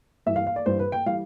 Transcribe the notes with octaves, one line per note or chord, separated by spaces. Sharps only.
G2 E3 G3 E5
F5
F5
D5
G2 E3 G3 C5
B4
G5
E3 G3 F5